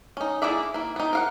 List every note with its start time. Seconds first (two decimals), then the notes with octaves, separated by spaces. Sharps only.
0.17 C#4 D#4
0.42 A#3 E4 G#4 D5 E5
0.74 A#3 E4
0.96 B3 D#4
1.13 A#4 F5 F#5